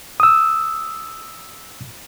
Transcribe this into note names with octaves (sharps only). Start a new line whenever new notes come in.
D#6 E6